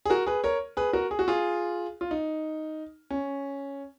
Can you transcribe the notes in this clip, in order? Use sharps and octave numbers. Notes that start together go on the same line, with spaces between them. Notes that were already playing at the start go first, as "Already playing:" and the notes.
G#4
F#4 A#4
G#4 B4
A#4 C#5
G#4 B4
F#4 A#4
G#4
F#4
F4 G#4
F4
D#4
C#4